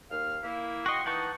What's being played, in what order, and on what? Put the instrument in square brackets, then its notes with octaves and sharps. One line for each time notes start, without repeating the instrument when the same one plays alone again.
[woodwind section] D#2 F5 F6
A#3 E4
[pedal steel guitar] F#4 D#5 [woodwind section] G5 C6 C#6
[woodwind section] E3 D#4 [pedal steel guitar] F#5 A5 C#6